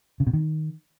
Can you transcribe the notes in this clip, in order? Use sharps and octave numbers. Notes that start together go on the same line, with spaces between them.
C#3
B2
D#3